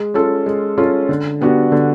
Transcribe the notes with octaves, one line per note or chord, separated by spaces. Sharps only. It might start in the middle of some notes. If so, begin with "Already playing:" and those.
Already playing: G#3
C#4 F4 A4
G#3
C#4 F4 A4
D3
G3 B3 D4 F#4
D3